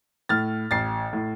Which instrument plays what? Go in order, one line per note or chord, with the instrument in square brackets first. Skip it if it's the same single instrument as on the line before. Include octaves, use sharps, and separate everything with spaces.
[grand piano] A2 F6 A6
A1 A6 C7
A2